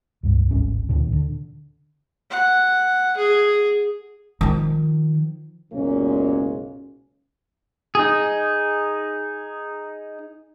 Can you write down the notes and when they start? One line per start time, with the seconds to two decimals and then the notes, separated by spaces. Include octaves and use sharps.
0.23 C#2 G2
0.51 D1 G#1 C#4
0.89 D2 A#2 D3 D#3
1.13 D3
2.31 F#5
3.17 G#4
4.41 D#3 F3
5.73 F#1 B1 A#2 G#3 A#3 C#4
7.95 D#4 G#4